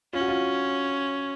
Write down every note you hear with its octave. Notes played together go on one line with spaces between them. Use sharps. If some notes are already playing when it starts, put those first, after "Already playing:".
C#4 F4
F#4
F4